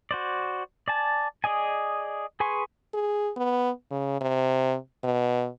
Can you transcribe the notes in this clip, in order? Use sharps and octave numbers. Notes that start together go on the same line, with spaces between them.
F#4 C5 D5
D5 G#5 A5
G#4 D5 D#5 G#5
G#4 B4 G#5 C6 C#6
G#4
B3
C#3
C3
B2